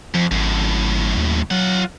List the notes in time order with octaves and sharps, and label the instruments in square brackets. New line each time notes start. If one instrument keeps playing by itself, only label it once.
[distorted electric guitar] F2 [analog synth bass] F3
[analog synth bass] G#1 [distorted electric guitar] F#2 A2
[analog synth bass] D#2
[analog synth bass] F#3 [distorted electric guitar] F4 F#5